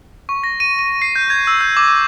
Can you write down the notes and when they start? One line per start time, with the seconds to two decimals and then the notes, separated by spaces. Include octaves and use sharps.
0.29 C#6
0.44 A#6
0.60 D#7
0.79 D#7
1.02 C7
1.16 G6
1.30 G#6
1.47 E6
1.61 G6
1.77 D6
1.88 D6